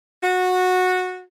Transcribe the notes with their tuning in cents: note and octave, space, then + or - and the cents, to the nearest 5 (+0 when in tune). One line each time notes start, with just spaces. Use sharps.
F#4 -15